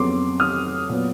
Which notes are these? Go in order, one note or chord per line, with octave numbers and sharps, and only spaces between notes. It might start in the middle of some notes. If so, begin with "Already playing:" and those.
Already playing: F2 C#3 F#3 B3 C6 D6
D#6 F6
A#2 F#3 B3